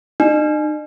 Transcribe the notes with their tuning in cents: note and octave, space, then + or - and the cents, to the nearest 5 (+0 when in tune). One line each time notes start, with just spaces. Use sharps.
D#4 -40